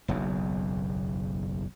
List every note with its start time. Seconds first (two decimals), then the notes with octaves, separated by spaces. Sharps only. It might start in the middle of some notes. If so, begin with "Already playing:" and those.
0.08 F#1 B1 E2